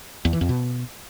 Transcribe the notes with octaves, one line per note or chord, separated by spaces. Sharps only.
E2
E3
F2
B2